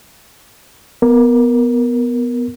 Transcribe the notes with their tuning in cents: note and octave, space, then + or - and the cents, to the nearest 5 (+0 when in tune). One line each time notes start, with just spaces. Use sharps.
B3 +0 A#4 +5